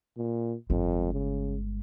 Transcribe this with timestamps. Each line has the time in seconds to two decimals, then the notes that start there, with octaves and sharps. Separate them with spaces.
0.17 A#2
0.70 G1 F2 G#3
1.13 C#3